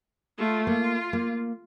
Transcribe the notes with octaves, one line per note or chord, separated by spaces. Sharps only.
A3 F4
A#3 F4
A#3